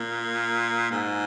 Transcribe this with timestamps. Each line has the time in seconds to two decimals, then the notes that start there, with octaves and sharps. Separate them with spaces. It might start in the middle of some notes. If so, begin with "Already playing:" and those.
Already playing: A#2
0.91 G#2